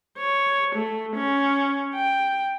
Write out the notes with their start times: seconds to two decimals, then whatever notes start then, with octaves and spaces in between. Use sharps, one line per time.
0.18 C#5
0.75 A3
1.15 C#4
1.95 G5